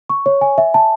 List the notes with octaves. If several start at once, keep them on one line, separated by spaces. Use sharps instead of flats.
C#6
C#5
G#5
E5
A5